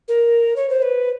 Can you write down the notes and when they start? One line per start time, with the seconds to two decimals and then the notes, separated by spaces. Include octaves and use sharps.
0.08 A#4
0.56 C#5
0.70 C5
0.82 B4